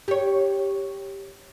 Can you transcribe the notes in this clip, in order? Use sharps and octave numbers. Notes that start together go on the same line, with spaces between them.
G4 C#5